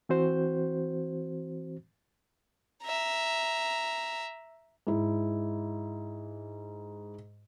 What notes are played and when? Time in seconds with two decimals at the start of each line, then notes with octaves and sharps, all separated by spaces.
0.09 E3 C4 F#4 C5
2.83 E5 A#5
4.87 G#2 E4